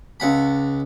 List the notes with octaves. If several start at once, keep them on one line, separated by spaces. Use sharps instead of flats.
C#2 F#5 B5